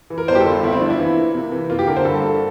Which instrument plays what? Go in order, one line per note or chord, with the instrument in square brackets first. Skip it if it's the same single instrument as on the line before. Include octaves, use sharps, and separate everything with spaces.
[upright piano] E3
[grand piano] A#4
[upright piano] G1 [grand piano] C5
[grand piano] G4
A4
[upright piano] G2
[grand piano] F4
[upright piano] G1 [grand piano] E4
[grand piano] C4
[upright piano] F3 [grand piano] D4
[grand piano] E4
[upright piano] E3
A#3
C3
E3
[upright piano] A#3 [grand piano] F4
[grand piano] G4
[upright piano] D3 [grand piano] A#4
[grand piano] C5
[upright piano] G2 [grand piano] A4
[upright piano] A#3